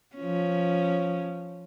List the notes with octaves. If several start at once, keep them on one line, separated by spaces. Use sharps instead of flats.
F3 C#4